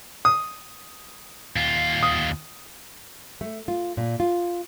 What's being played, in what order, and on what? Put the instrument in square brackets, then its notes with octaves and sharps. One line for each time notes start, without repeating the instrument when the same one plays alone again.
[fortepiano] D#6
[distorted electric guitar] D#2 F4
[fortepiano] D#6
[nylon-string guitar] A3
F4
A#2
F4